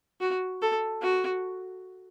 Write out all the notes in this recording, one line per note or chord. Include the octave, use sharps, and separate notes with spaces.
F#4
A4
F#4